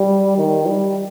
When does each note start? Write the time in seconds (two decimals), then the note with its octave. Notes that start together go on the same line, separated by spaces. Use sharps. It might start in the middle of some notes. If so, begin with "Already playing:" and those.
Already playing: G3
0.38 D#3
0.67 G3